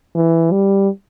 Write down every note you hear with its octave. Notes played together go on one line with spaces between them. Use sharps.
E3
G3